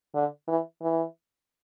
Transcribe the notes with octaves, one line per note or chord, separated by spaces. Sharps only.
D3
E3
E3